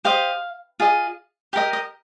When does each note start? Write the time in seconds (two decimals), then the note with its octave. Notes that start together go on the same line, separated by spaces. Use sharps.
0.05 G4 C5 D#5 F5
0.80 F4 G#4 D#5
1.53 G4 A#4 D#5 F5
1.73 D#5